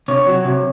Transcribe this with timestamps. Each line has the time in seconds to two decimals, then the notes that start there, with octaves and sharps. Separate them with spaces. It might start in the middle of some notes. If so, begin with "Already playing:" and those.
0.08 C3 C#5
0.27 F#3
0.45 C3